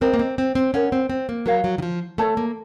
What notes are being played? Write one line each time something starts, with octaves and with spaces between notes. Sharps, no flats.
C4 A#4 D#5 A#5
A#3
C4
C4
C4
C#4 A#4 C#5 F#5
C4
C4
A#3
F#3 A#4 C#5 F5
F#3
D#3
F3
A3 A4 C#5 A5
A#3